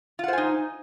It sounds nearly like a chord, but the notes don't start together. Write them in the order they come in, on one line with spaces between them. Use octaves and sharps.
F4 F#5 C5 G#5 D#4